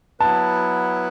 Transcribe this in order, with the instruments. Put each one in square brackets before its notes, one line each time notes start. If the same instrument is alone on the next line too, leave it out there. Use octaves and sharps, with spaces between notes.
[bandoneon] F#3 B3 E4 B4 [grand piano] A5